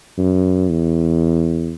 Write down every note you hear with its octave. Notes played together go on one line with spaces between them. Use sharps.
F#2
E2